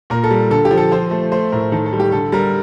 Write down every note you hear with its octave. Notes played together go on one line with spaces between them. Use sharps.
A#2 A#4
A4
G3
D3 A4
G4
F3
A4
F3 C5
A3
A3 C5
A2 A#4
D#3 A4
A4
G3
G4
D3 A4
G3 A#4